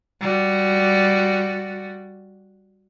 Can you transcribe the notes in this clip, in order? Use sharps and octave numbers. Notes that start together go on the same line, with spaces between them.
G3 F#4